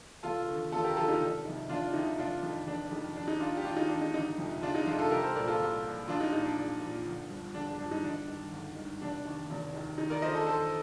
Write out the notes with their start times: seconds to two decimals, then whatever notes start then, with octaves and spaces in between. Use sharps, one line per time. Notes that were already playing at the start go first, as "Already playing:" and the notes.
0.23 F1 F4 A4
0.47 D#2 D3 F3
0.72 F1 F4 A4
0.84 G4 A#4
0.96 D#2 D3 F3 F4 A4
1.08 D#4 G4
1.20 F1
1.45 F2 C3 D#3
1.69 F1 D4 F4
1.94 F2 C3 D#3 D#4
2.18 F1 D4 F4
2.43 F2 D#3
2.67 F1 D4
2.91 F2 D#3
3.16 D#2 D4
3.28 D#4
3.40 D#3 D4 F4
3.57 G4
3.65 D#2 D4 F4
3.77 D#4
3.88 D#3 D4
4.02 D#4
4.14 G1 D#4
4.38 F2 C3 F3
4.62 G1 D4 F4
4.75 D#4
4.86 F2 C3 F3 D4 F4
4.99 F4 A4
5.11 C2 G4 A#4
5.23 A4 C5
5.35 A#2 F3 A#4 D5
5.48 F4 A4
5.59 C2
5.84 A#2 F3
6.08 A#1 D4 F4
6.21 D#4
6.32 A#2 F3 D#4
6.45 D4
6.58 A#1
6.82 A#2 F3
7.06 G1
7.30 G2 F3
7.54 G1 D4
7.67 D4
7.79 G2 F3 D4
7.91 D#4
8.03 G1 D4
8.28 G2 D#3
8.52 G1
8.76 G2 D#3
9.01 F1 D4
9.25 D#2 D#3
9.50 F1
9.74 D#2 D#3
9.98 D#2 D#4
10.10 A#4 D5
10.22 D3 F3 C5 D#5
10.35 A4 C5
10.47 D#2 A4 C5